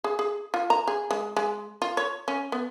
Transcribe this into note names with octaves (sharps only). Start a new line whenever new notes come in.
G#4
G#4
F4
A#5
G#4
G#3
G#3
F4
C#5
C#4
B3